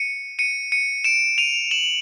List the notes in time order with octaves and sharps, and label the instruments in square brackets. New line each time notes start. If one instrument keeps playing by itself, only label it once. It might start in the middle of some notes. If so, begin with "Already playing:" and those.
Already playing: [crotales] C#7 D#7
C#7 D#7
C#7 D#7
D7 E7
D#7 F7
E7 F#7